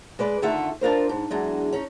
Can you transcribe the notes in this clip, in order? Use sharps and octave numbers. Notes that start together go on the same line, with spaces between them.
G#3 B4 D5
D3 D#3 A3 F4 E5 F#5
D4 F4 A#4 C5
G#2
E2 F#3 G#3 D4
C#4 D#4